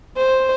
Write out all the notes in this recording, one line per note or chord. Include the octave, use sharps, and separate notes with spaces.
C5